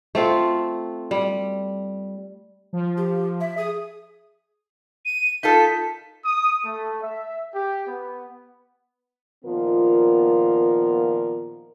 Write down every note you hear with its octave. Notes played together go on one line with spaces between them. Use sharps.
A3 C4 F4
G3
F3
G4
E5
G#4 D#6
D#7
D#4 F4 A4 B6
D#6
A3
E5
G4
B3
A#2 D#3 F3 B3 F4 A#4